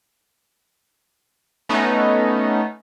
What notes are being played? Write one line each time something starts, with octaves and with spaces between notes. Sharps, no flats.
A3 B3 C#4 D#4